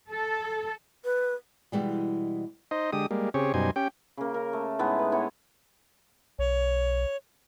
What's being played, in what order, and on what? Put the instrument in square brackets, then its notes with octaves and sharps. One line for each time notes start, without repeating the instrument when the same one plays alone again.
[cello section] A4
[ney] B4
[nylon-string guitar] B2 E3 G3 G#3
[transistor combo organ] D#4 C5 D#5
D3 G#3 G4 D#6
G3 G#3 A#3
C#3 C4 G4 G#4 C#5
F#2 B2 G3 D#4 C5 G#5
C#4 G4 G5
[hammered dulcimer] C#3 A#3
A#4
A3
A2 G#3 B3 D#4
B4
B3 E4 C#5
[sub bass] B1 [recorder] C#5